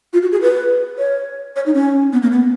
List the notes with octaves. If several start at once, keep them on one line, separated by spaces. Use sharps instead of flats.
F4
F#4
G#4
B4
C#5
C#5
D#4
C#4
B3
A#3
B3